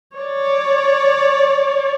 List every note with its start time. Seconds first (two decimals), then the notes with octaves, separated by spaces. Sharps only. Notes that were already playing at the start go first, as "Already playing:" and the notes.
0.17 C#5 D5